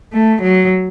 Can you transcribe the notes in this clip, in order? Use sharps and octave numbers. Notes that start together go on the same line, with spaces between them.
A3
F#3